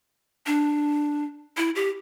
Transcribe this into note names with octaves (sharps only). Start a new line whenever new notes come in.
D4
E4
G4